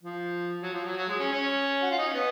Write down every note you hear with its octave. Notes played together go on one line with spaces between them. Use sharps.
F3
F#3
F3
F#3
F#3
G#3
C#4
C#4
F#4
F4
D#4
C#4
B3